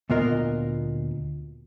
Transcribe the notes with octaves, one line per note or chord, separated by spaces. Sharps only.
D2 A#2 B3 F4 A#4 D#5